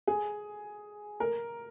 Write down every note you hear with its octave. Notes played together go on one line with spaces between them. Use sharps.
G#4
A#4